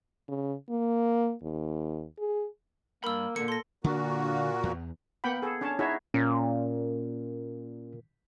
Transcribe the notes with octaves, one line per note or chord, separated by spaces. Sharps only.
C#3
A#3
D#2
G#4
G2 A#3 A#4 B5 E6
A#2 D3 A#3 C#7
A4 C6 A#6
A#2 D3 A#3 D4 F#4
E2
A#3 B3 F#5 G5 B5
G#4 A4
C#4 D4 C#5 A5
D#4 E4 F#4 G#4 C#5 E5
A#2 C#4